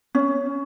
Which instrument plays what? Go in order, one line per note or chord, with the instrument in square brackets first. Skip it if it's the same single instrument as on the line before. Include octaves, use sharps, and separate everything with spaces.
[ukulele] C#4